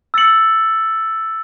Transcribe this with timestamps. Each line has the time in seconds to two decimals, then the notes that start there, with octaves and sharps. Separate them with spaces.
0.14 E6 A6 C#7 F#7